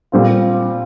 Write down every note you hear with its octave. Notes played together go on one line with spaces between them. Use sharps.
A#2 G3 C4 F4